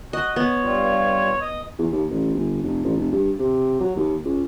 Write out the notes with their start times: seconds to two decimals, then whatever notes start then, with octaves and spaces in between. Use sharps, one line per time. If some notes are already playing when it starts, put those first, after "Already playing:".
0.13 F#4 D#5
0.36 B3 C#5
0.63 G2 G3 F4
1.41 D#5
1.79 E2
1.92 D#2
2.10 A1
2.34 G1
2.63 F1
2.84 A1
2.97 F1
3.13 G2
3.39 C3
3.80 F#3
3.96 D#2
4.25 C#2